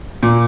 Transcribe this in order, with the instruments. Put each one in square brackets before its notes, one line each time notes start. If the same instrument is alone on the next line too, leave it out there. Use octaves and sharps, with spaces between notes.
[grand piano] A#2